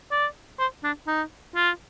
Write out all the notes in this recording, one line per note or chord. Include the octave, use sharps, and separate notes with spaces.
D5
C5
D4
D#4
F4